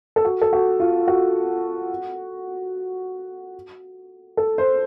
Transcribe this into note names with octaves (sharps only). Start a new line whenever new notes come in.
A4
F#4
A4
F#4
F4
F#4
A4
C5